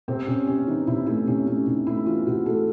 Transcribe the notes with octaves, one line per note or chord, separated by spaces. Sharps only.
C3 C4
C3 C#4
C3 C#4
E3 D#4
C3 E4
A3 E4
C3 C#4
A3 C#4
C3 D#4
A3 E4
E3 F4
C3 F#4
A3 A4